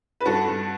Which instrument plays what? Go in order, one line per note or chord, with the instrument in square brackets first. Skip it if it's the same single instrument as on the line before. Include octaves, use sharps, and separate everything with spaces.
[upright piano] B4
G2 F#4 A4
G2